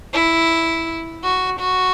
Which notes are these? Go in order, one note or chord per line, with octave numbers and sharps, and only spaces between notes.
E4
F#4
F#4